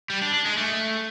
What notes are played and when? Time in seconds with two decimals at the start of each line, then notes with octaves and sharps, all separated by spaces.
0.10 G3
0.22 D4
0.34 D4
0.45 G#3
0.57 A3